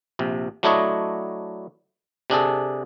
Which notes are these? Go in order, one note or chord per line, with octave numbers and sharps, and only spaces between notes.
A#1 C3
F#3 A3 D4 E4 C#5 D#5
C3 D4 G#4 A4